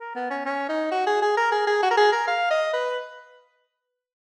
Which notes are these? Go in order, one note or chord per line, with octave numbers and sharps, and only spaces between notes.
A#4
B3
C#4
C#4
D#4
F#4
G#4
G#4
A#4
G#4
G#4
F#4
A#4
G#4
A#4
F5
D#5
B4